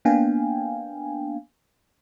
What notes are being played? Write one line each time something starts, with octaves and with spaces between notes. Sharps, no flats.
A#3 B3 D4 F5 G5 G#5